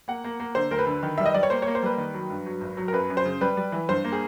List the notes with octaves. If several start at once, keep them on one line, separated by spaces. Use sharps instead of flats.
A#3 F#5
A#3
A#3
D3 C5
D2 A#4
B4
D3
D#3
G3 E5
D#5
G3 D5
C#5
A#3 C5
A#3 C#5
C5
G3 B4
D#3
F#3
G2
F#3
G#1
F#3
A#4
F#2 B4
F#2
C5
C#3
G3 B4
G3
E3
G2 C5
A#3
G#4